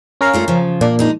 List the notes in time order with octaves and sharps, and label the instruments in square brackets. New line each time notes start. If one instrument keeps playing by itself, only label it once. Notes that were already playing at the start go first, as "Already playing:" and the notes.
[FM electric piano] C#4 A#4 F5
[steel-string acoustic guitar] G2 A3 F4
C#3 F3
[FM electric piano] A#2 D4 [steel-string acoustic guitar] A#3
[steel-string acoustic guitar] G#3 D#4